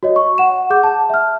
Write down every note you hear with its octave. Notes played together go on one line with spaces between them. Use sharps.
F#4 C#5 D#5
C#6
F#5 E7
G#4 F#5 D6 G6
A5
E5 F6